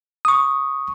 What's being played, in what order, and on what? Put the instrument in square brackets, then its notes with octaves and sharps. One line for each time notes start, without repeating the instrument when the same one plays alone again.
[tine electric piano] C#6 D#6